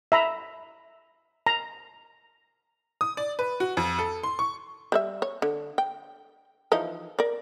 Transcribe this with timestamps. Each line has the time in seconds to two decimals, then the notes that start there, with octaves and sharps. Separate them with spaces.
0.12 E5 A#5 B5
1.47 A#5
3.01 D#6
3.17 D5
3.39 B4
3.60 F#4
3.77 F2
3.99 A4
4.23 C6
4.39 C#6
4.92 G3 B4 E5
5.22 C#5
5.42 D3
5.78 G5
6.72 E3 F3 D#4
7.19 A#4 D5